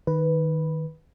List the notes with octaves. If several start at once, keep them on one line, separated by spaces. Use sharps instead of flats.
D#3 B4